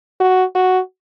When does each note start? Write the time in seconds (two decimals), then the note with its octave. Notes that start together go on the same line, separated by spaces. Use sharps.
0.20 F#4
0.55 F#4